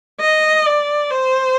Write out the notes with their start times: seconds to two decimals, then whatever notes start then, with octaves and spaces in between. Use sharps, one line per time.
0.20 D#5
0.66 D5
1.11 C5